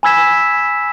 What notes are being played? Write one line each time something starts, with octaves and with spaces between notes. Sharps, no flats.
G#5 B5 E6 G#6 B6 E7